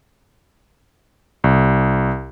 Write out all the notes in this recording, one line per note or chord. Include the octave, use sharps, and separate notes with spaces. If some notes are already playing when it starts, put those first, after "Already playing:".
C2